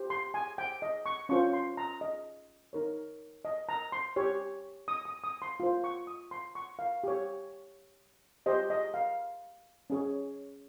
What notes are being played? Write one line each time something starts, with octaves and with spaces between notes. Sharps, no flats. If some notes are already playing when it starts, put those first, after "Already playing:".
Already playing: G4 C5
C6
G#5
G5
D#5
C#6
C#4 F4 C5 C#6
C6
A#5
D#5
D#4 A#4 C#5
D#5
A#5
C6
G4 C#5
D#6
D#6
D#6
C6
F4 C5
C#6
D#6
C6
C#6
F5
G4 C#5
G4 C5 D#5
D#5
F5
C#4 G#4 C#5